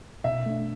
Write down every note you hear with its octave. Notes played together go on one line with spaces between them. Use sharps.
B2 E5
A3 D4